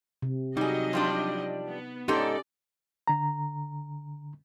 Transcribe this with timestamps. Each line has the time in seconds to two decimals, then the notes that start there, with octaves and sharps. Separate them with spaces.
0.22 C3
0.57 F#3 G3 D#4 G#4 D#5
0.93 F3 G3 D4
1.68 B3
2.08 G#2 C#4 D#4 G4 A4 D5
3.07 D3 A#5